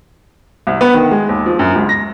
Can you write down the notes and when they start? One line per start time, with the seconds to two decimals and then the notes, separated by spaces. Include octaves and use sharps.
0.67 C2
0.81 B3
0.94 D#3
1.11 G#3
1.29 D#2
1.46 F3
1.59 F#2
1.76 C#2
1.89 A#6